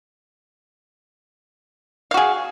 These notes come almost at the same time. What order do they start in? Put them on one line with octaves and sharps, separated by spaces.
F5 F#4 G#4